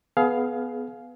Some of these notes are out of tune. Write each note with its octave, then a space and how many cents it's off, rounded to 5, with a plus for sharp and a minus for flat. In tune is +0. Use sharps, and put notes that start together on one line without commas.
B3 +5 G#4 +30 F5 +0